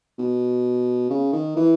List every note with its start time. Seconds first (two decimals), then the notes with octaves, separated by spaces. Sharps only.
0.18 B2
1.10 C#3
1.33 D#3
1.56 E3